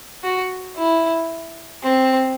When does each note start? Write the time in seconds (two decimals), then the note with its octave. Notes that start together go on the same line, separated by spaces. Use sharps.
0.23 F#4
0.76 E4
1.83 C4